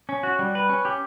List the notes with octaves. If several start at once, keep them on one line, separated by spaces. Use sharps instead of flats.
C#4
F#4
G3
B4
C#4
G4